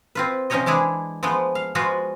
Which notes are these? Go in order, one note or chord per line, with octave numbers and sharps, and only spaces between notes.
C4 F4 B4
C3 F3 C#4 D#4 C#5 D#5
E3 G#3 D4 E4 G#4
F3 G#3 A3 B3
F5
F3 G#3 F4 F#4 B4